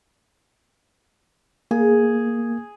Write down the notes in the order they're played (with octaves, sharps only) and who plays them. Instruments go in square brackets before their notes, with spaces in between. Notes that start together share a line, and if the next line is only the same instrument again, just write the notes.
[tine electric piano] A#3 [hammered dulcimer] G#4